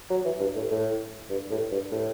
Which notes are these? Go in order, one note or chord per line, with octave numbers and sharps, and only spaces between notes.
F#3
E3
G2
A2
A2
G2
A2
G2
A2